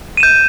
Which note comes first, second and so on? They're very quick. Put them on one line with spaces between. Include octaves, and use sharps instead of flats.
D#7 E7 G6